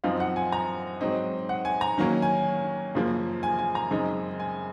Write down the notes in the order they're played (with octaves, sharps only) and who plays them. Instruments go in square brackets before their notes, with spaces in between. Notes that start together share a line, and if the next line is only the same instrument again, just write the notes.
[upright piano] F#2 F3 C4 D#4 F5
F#5
G#5
A#5
G#2 F#3 C4 D#4
F#5
G#5
A#5
D#3 F#3 A#3 C#4
G#5
F#2 C#3 F3 A#3
G#5
G#5
A#5
F#2 C#3 G#3 C4 D#4
G#5